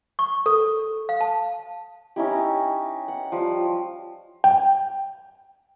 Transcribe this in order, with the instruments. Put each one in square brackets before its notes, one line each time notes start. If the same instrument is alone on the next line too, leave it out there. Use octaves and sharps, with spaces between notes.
[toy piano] C#6
A4
F5
A5
[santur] C#4 D#4 E4 G4
D#4
F#5
F3 G3
[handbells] G5